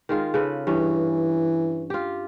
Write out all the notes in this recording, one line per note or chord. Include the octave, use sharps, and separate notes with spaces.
D#3 G#3 F4
C#3 A4 B4
G2 E3 C#4
F4 G4